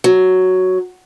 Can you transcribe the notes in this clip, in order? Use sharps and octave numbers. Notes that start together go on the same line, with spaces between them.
F#3